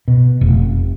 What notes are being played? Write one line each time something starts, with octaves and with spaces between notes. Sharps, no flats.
B2
F1